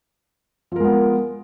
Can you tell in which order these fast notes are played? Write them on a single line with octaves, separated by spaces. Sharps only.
F3 A#4 G#3 B3